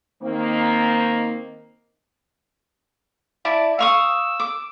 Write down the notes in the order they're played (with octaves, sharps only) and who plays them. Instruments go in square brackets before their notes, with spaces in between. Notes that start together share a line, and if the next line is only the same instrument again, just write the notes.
[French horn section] D#3 A#3 C4
[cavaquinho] E4 D5 A5
[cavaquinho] F5 C#6 D#6 [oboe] E6
[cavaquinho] D6